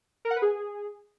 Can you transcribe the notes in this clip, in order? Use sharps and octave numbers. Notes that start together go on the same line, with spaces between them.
A#4
F#5
B4
G#4